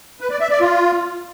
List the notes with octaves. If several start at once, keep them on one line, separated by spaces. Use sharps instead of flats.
B4
D5
E5
D5
F4